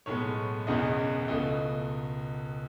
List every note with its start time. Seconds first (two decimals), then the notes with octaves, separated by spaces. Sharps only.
0.06 B1 A2 G#3 B3 C#5
0.67 E1 E2 C#3 E3 B3 D#5
1.28 C#2 B2 A3 D#5